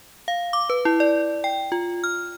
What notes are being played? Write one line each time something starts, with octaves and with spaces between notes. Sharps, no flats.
F5
D6
B4
E4
D5
G5
F4
F6